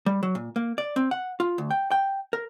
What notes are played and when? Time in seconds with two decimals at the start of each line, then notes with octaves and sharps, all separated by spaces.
0.06 G3
0.23 F#3
0.35 A#2
0.56 A#3
0.78 D5
0.96 C4
1.11 F#5
1.40 F4
1.58 D2
1.70 G5
1.91 G5
2.33 A#4